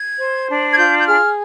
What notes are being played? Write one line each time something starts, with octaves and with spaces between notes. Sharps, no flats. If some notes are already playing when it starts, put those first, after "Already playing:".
Already playing: G#6
C5
D4
G#6
F4 G6
G6
G#4 F6